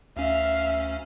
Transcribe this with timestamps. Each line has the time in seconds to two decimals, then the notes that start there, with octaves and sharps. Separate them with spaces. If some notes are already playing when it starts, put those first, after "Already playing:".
0.17 D2 C#4 E5 F5